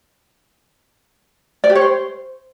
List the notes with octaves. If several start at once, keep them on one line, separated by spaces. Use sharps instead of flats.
D5
G4
C#5
C5